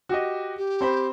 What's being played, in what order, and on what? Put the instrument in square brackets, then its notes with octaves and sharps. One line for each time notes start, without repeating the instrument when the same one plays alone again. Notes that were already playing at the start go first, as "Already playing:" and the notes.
[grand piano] F#4 G4 D#5
[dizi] G4
[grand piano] C4 C5 B5